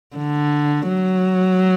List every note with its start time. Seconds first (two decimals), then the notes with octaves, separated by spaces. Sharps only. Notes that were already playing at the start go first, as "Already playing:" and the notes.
0.16 D3
0.89 F#3